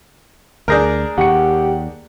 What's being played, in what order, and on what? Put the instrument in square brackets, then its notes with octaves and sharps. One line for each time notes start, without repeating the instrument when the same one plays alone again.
[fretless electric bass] D2 [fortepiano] D4 G#4 A#4 [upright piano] A#5 G6 A#6
[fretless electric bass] D#2 [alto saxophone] G4 [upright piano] F#5 C#6 C#7